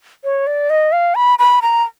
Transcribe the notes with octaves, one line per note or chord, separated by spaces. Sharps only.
C#5
D5
D#5
F5
B5
B5
A#5